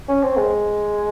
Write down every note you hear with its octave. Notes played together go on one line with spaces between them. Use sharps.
C#4
C4
G#3